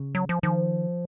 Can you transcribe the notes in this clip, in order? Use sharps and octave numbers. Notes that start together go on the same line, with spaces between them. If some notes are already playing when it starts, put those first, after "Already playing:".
Already playing: C#3
F#3
F3
D#3 F3